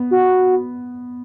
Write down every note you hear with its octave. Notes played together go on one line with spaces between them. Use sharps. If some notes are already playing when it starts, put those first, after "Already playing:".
Already playing: B3
F#4